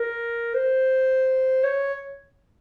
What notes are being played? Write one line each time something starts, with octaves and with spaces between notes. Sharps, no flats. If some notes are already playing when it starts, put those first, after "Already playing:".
Already playing: A#4
C5
C#5